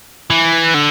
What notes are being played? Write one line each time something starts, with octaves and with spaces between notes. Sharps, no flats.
E3
D3